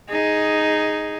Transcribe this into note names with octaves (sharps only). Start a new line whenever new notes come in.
D#4 G#4